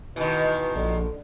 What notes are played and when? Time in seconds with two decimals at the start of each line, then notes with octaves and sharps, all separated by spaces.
0.16 B2 D#3 E3
0.76 A#1 D3